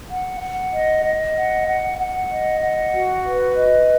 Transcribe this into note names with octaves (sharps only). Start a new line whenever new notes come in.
F#5
F#5
D#5
D#5
F#5
F#5
F#5
D#5
F#5
F#4
B4
D#5